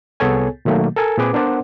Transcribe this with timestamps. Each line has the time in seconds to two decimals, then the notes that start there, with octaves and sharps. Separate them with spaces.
0.20 C2 B3 G#4 A4 C#5 G#5
0.65 B2 D#3 F#3 A3 A#3
0.96 A4 A#4 G#5
1.18 A#2 C4 G#4 B4 D6
1.33 B3 D4 A#4 C5 D5 F#5